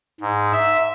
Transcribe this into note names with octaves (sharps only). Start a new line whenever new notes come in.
G#2
E5